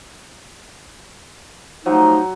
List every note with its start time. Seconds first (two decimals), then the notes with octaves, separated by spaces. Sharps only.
1.86 F3 F#3 A3 D#4